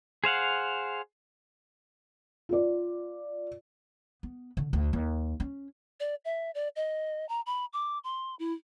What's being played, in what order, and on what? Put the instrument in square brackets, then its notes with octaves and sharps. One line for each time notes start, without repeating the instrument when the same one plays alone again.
[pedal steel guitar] G#4 C5 F5 F#5
[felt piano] F4 D5
[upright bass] B3
D3
D2
D#2
C#4
[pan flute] D5
E5
D5
D#5
A#5
B5
D6
C6
E4